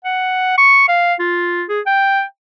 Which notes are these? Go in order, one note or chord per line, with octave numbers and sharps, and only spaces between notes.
F#5
C#6
F5
F4
G#4
G5